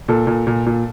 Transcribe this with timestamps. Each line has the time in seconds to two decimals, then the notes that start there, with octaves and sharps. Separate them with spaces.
0.08 A#2 A4
0.27 A#2
0.47 A#2
0.66 A#2